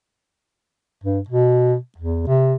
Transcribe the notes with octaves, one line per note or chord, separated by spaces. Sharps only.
G2
B2
E2
C3